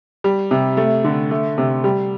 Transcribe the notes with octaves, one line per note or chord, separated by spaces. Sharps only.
G3
C3
A3
D3
A3
C3
G3